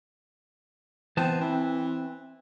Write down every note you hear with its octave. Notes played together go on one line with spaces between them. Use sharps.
E3 B3 C4 A5
E3 C4